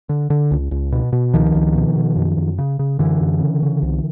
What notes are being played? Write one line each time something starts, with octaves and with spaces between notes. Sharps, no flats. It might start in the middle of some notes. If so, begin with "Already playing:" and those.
D3
D3
C#2
C#2
B2
B2
C#2 D#3 F3
C#2
B2
B2
F#2
F#2
C#3
C#3
F#2 D3 E3
F#2
C#3
C#3
C2